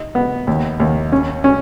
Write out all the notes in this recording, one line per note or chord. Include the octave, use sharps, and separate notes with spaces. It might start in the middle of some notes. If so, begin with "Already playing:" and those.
Already playing: D#4
B3
D#2
D#2
C#4
C#4